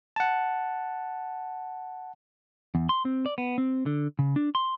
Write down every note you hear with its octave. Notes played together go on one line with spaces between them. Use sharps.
F#5 A5
E2
C6
C4
D5
B3
C4
D3
C#3
D4
C6